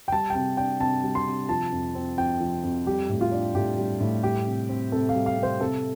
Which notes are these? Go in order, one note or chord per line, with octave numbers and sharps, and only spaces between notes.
G5
G3 A5
G5
C3 A5
D4 G5
C3 A5
G3
C6
C3
F3 A5
F2
C4
F2 G5
F3
F2
G3 G4
A2
F4
D4
A2 G4
G3
A2
G3 G4
C3
C4
C3 A4
F5
G3
F5
C3
C5
C3 A4